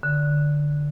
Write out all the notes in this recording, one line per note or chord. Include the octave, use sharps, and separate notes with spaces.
D3